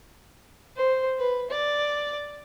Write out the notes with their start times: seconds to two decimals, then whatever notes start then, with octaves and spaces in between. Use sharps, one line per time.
0.76 C5
1.19 B4
1.51 D5